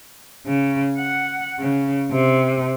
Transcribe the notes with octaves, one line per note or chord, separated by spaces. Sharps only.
C#3
F#5
C#3
C3